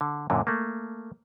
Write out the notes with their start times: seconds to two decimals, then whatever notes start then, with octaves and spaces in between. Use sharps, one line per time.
0.01 D3
0.30 F#2 A#2 D3
0.47 A3 A#3